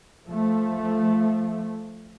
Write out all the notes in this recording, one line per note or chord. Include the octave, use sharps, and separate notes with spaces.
F3 A3